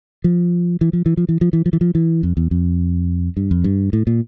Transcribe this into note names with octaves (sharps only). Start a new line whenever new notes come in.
F3
E3
F3
E3
F3
E3
F3
E3
F3
E3
F3
E3
F2
E2
F2
G2
F2
G2
A2
A#2